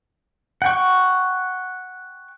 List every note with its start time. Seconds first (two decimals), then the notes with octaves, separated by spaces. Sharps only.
0.62 F#5 G5 C#6